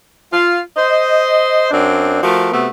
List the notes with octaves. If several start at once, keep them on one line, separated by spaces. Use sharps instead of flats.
F4
C5 D#5
F#2 C4 D4
F3 A3 F#4 A#4
C3 A3 B3 F#4